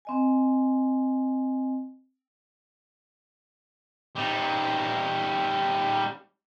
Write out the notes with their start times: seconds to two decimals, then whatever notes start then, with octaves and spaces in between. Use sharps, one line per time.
0.05 C4 D#5 G#5
4.15 G3 D#4